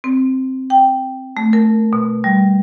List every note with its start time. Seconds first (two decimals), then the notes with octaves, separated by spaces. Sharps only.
0.04 C4
0.70 G5
1.37 A3
1.53 A#4
1.93 B2
2.24 G3